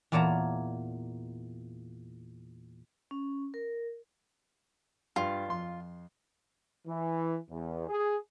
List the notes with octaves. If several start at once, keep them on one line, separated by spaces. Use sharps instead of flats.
E2 A#2 A#3 C#5 A5 A#5
C#4
A#4
G2 F4
F2 C6
E3
E2
G#4